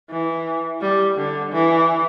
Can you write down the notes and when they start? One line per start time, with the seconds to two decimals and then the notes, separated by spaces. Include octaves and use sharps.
0.10 E3
0.81 G3
1.17 D3
1.52 E3